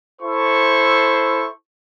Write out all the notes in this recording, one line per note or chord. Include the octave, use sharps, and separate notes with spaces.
E4 A4 C5 C#6